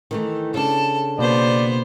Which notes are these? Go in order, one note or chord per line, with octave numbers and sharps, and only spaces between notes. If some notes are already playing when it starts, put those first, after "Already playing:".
D#3 E3 A3
C#3 D4 A4 A5
B2 A#3 B3 C5 D5